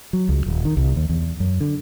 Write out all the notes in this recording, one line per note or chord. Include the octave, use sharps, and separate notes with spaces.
F#3
C#2
D#1
D#3
C2
D#2
E2
F#2
D3